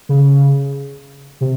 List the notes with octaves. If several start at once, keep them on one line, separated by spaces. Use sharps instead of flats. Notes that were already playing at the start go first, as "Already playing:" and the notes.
C#3
C3